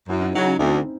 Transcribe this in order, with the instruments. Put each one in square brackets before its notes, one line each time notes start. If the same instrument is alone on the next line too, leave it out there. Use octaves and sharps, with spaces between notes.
[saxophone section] F#2 [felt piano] E4
[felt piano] D#4
[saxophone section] C#3 F#3 [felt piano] D#4
[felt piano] C#4
[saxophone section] D2 [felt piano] C4